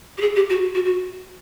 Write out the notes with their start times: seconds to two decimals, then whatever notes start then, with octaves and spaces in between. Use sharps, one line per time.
0.18 G4
0.21 G#4
0.36 G4
0.50 F#4
0.75 F#4
0.85 F#4